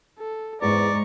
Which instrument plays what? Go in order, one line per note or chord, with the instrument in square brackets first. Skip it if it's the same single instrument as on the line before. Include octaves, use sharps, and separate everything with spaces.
[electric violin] A4
[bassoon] E2 [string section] G#2 [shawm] D5 [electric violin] A#5 C#6